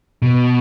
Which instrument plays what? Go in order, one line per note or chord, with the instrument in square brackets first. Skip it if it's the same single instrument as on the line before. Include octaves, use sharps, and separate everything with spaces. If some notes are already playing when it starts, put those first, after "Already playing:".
[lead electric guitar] B2